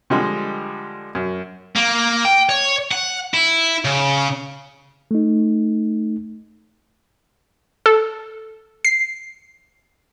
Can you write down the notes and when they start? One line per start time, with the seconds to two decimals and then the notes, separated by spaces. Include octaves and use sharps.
0.10 D3 F3 G3 G#3
1.15 F#2
1.76 A#3
2.25 G5
2.49 C#5
2.92 F#5
3.34 E4
3.85 C#3
5.11 A3 D#4
7.86 A4
8.85 C7